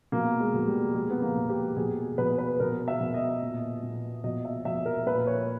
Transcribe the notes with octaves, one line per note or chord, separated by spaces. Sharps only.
B2 A#3
G#3
B2
G3
B2 G#3
B3
A#3
B2
G4
B2 G#4
B2 B4
B4
B2 A#4
E5
B2
D#5
A#2
A#2
B2 D#5
E5
B2 E5
A#4
A#2 B4
C#5